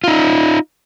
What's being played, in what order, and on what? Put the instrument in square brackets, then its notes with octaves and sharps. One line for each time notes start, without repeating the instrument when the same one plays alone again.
[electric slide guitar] D#4 F4